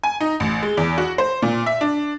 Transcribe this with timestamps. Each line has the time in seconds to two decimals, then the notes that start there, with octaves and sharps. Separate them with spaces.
0.04 G#5
0.20 D#4
0.40 A1
0.62 G#3
0.77 E2
0.98 F#4
1.18 C5
1.42 A#2
1.66 E5
1.81 D4